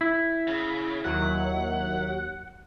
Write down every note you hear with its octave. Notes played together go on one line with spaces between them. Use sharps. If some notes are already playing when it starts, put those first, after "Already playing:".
E4
C#3
D#2 F#3 F#5